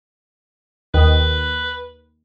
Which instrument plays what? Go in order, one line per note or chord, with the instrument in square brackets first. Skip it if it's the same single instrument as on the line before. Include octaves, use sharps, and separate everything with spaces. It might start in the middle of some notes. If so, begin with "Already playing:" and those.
[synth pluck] D#2 D#3 [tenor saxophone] B4